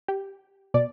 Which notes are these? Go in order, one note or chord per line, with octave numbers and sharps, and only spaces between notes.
G4
B2 D5